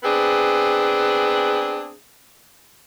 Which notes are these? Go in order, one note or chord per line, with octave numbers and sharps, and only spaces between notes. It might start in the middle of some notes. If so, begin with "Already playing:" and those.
B3 C4 D4 G#4